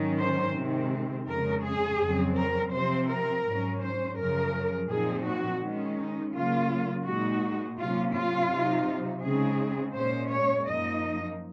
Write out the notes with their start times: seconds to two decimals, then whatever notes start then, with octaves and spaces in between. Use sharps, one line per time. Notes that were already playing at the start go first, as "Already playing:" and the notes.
Already playing: G#2 D#3 F#3 C#4
0.20 C5
0.55 C3 D#3 G#3 C4
1.28 F2 C#3 G#3 A#4
1.64 G#4
2.00 F2 C#3 F#3 C4
2.37 A#4
2.73 C3 F3 C4 C5
3.09 A#4
3.45 G#2 F#3 C#4
3.82 C5
4.17 F#2 C#3 F3 A#4
4.89 A#2 F3 C4 D#4 G#4
5.25 F#4
5.62 D#3 G#3 C#4
5.98 D#4
6.34 C#3 F#3 A#3 F4
7.06 A#2 G#3 D#4 F#4
7.78 C3 F#3 A#3 C#4 F4
8.15 F4
8.51 C3 F#3 C4 D#4
9.23 C#3 G#3 C4 D#4 G#4
9.96 A#2 G#3 C#4 C5
10.31 C#5
10.68 F#2 F3 A#3 D#4 D#5